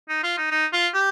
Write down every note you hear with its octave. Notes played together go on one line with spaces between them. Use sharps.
D#4
F4
D#4
D#4
F4
G4